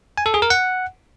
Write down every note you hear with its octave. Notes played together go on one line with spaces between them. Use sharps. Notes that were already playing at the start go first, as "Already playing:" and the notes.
G#5
A4
G#4
A#4
F#5